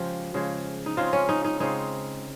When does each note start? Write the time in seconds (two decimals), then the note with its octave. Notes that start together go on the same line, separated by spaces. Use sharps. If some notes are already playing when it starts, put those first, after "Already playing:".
Already playing: C#3 F3 G#3 F4 G4
0.34 C#3 F3 G#3
0.86 D#4
0.97 C#3 G#3 C4 F4
1.13 C#4
1.29 D#4
1.45 D#4
1.60 C#3 G#3 C4 D#4